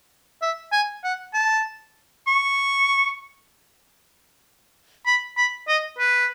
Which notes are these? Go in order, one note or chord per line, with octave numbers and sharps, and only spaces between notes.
E5
G#5
F#5
A5
C#6
B5
B5
D#5
B4